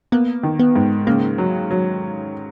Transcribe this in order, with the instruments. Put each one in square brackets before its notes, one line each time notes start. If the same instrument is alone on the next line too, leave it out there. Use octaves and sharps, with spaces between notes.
[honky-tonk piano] A#3 [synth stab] B3
[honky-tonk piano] D#3
[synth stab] B3
[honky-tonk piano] G#2
[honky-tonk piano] C#3 [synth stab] A#3
[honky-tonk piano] F#3
F#3